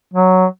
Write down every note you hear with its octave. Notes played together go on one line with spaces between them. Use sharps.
F#3